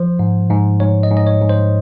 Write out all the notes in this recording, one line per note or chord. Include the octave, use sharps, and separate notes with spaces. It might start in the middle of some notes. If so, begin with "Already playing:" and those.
Already playing: F3 C5
G#2
G#2
G#2 C#5
D#5
G#2
D#5
C#5
G#2
C5